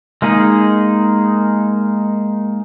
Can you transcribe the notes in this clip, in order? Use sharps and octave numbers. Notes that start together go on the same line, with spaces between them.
G#3 A#3 D#4 G#4